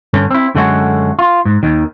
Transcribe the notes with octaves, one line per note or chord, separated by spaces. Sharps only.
G2 D3 C#4
C4 E4
F#2 D3 G#3 A3 C#4 F#4
F4
G#2
D#2 D#3